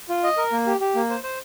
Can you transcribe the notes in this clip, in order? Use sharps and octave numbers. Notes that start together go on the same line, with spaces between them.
F4
D#5
A#4
A#3
G4
G4
A#3
C5
C5